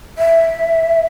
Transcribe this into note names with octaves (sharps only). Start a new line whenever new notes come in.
E5